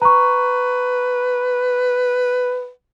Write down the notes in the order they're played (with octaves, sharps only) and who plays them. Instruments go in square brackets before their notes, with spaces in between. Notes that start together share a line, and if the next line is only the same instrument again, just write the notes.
[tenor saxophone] B4 [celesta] A#5 C#6